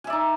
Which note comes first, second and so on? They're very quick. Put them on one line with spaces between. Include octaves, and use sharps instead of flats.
G#5 E5 D5 D#4